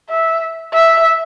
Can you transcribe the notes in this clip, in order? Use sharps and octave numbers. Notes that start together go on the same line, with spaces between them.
E5
E5